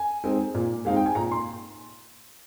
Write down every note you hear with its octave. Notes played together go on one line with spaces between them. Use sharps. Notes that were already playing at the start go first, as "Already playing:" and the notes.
Already playing: G#5
G#3 C4 D#4
A#2
G#3 C4 D#4 F5
G5
G#5
A#2 A#5
C6